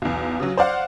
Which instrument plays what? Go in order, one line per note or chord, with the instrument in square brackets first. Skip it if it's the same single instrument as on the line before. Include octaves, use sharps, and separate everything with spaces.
[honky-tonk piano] B1 E2
C#3 F#3
C5 D5 F5 F#5